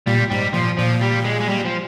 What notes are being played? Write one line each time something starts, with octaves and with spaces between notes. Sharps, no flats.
A#2 G3
G#2 G3
A#2 F3
A#2 F3
G3
G#3
G#3
G3
F3